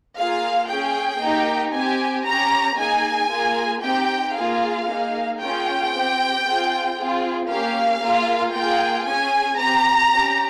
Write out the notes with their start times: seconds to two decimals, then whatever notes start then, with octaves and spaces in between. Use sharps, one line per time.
0.16 A#3 F4 G#4 F5
0.69 C#4 G#4 G5
1.21 A#3 D#4 G4
1.73 C4 G4 G#5
2.26 C#4 G4 A#5
2.78 A#3 D#4 G#4 G#5
3.31 A#3 F4 G#4
3.83 C4 D#4 G4 G5
4.35 A#3 F4 G#4 F5
4.88 A#3 D#4 G#4
5.40 A#3 C#4 F4 G#4 G5
5.92 C4 G4
6.45 C4 F4 G#4
6.97 C4 F4 G#4
7.49 A#3 C#4 G4 F5
8.02 A#3 F4 G#4
8.54 A#3 F4 G#4 G5
9.06 C#4 G#4 G#5
9.59 C4 G4 A#5
10.11 C#4 G4